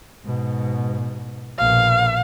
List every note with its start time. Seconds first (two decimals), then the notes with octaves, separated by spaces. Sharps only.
0.24 G#2 B2
1.59 A#1 B2 F5